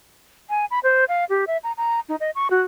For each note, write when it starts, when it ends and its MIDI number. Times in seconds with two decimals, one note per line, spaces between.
0.50 0.65 80
0.71 0.79 83
0.83 1.05 72
1.09 1.25 77
1.30 1.45 67
1.47 1.57 76
1.64 1.72 82
1.77 2.00 82
2.09 2.16 63
2.20 2.31 75
2.35 2.48 85
2.50 2.62 66